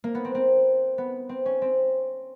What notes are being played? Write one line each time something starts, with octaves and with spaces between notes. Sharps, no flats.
A#3
B3
C4
C4
B3
C4
C#4
C4